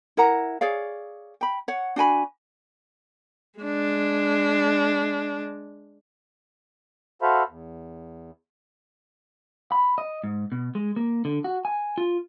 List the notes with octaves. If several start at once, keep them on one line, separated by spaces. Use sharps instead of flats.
E4 A#4 F#5 A#5
G#4 C#5 D5 F5
G5 B5
C#5 F#5
D4 F#4 G#5 B5
G#3 D4
F#4 A4 C5 E5 F5 B5
E2
B5
D#5
G#2
B2
G#3
A#3
D3
F#4
G#5
F4